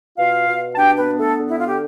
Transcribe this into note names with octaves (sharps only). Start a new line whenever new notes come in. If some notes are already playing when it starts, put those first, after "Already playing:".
B2 F4 F5
B2
A5
D4 G4 G5
B3 B4
B3
A3 A4
D3
E4
F4
D3 G4